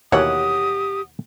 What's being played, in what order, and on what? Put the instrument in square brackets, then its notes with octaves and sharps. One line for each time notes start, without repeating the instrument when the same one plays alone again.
[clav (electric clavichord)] D#2 B2 E3 [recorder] G4 [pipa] C#5 F#5 [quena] D#6